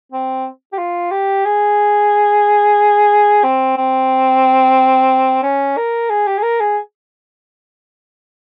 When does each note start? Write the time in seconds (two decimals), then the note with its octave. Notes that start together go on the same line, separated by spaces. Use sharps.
0.12 C4
0.73 G4
0.78 F4
1.11 G4
1.45 G#4
3.44 C4
3.77 C4
5.43 C#4
5.77 A#4
6.10 G#4
6.27 G4
6.38 G#4
6.43 A#4
6.60 G#4